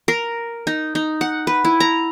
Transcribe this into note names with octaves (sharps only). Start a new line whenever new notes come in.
A#4
D#4
D#4
F#5
B4
E4
A#5